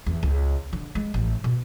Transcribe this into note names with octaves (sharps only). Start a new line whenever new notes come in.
E2
C#2
D3
G#3
A1
B2